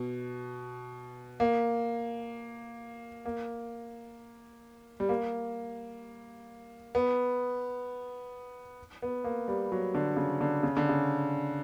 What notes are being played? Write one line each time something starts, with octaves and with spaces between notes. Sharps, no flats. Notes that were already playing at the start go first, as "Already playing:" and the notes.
Already playing: B2
A#3
A#3
G3
A#3
B3
B3
A#3
G3
F#3
D3
C#3
D3
C#3
D3
C#3